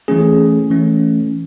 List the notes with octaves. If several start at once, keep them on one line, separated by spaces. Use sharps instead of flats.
E3 A3 C#4 G#4
E3 A3 C#4